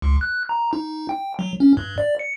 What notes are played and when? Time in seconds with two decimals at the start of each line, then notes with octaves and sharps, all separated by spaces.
0.02 C#2
0.21 F#6
0.49 A#5
0.73 D#4
1.09 G5
1.39 F#3
1.60 C#4
1.77 G2
1.98 D5
2.19 C#7